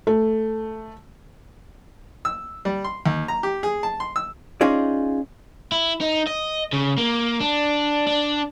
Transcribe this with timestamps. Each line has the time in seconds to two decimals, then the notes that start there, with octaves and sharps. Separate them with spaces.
0.07 A3
2.25 E6
2.65 G3
2.85 C6
3.06 D#2
3.28 A#5
3.43 G4
3.63 G#4
3.83 A5
4.00 C6
4.16 E6
4.61 C#4 D#4 F4 G#4 D5
5.72 E4
6.01 D#4
6.27 D#5
6.73 C#3
6.98 A#3
7.40 D4
8.07 D4